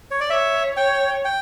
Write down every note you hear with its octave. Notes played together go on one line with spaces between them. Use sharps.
C#5
D5
C#5 E5
C#5 G5
G5